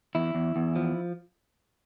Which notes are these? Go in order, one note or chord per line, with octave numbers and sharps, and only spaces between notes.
E2 E4
E2
E2
F3